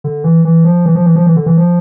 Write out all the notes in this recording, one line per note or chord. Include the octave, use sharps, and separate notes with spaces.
D3
E3
E3
F3
E3
F3
E3
F3
E3
D3
E3
F3